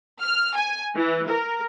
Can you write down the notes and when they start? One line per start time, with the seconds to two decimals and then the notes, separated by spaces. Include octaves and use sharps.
0.22 F6
0.56 G#5
0.96 E3
1.29 A#4